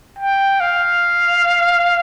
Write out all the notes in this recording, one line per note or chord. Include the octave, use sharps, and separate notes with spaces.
G5
F5